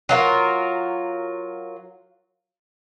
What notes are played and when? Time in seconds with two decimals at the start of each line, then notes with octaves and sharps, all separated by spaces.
0.09 F#3 F4 A#4